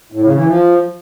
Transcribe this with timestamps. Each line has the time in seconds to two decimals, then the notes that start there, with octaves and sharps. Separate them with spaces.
0.12 A2
0.23 C#3
0.35 E3
0.47 F3